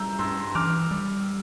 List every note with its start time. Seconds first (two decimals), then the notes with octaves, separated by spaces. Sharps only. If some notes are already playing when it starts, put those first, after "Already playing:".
Already playing: G3 A#5 E6 G6
0.18 G2 C6 E6
0.55 E3 D6 F6
0.91 G3